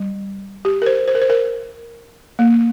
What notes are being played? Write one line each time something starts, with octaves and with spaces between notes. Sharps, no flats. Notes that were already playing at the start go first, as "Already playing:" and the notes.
Already playing: G3
G4
A#4
C5
C5
A#4
C5
A#4
A#3